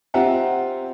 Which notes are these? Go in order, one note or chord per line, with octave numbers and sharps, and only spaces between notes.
C4 F4 G4 E5 F#5 A#5